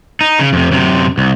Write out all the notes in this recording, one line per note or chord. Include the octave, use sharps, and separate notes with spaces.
D#4
C#3
F2 C3
F#2 C3
C2